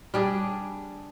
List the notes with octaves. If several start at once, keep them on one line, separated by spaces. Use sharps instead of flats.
G3 D4 G#4